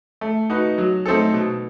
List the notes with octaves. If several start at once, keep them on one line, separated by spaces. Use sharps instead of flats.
A3
D#4 F#4 B4
F#3
A3 C4 D#4 A4
B2